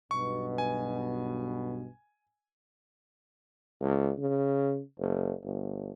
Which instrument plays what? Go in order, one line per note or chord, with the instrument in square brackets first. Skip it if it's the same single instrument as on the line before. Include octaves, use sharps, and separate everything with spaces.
[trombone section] B1 G2 B2 [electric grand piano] C#6
[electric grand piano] G#5
[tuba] C#2
C#3
F#1
G1